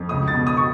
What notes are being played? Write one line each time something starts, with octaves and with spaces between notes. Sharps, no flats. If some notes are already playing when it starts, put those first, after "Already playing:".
Already playing: F2
C#2 D#6
A6
B2
D#6
C#6